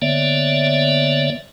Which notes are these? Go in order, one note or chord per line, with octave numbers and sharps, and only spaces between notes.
D3 A#3 B3 C#5 D5 E5